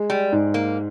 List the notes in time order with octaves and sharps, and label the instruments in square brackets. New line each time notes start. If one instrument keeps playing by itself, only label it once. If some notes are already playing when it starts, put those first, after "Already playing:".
Already playing: [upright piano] G#3
[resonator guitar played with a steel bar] G3
[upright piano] G#2
[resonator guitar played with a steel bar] A#3